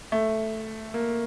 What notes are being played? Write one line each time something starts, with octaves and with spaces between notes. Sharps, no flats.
A3
A#3